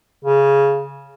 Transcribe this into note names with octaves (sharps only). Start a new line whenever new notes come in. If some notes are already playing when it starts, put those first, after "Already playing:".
C#3